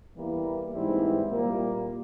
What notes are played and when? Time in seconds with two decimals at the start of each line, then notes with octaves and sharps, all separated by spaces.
0.15 E2 E3 G3 A#3 E4
0.73 G#2 E3 G3 C4 E4
1.31 A#2 G3 A#3